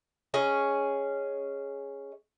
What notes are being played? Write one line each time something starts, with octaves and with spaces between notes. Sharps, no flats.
C#4 G#4 D#5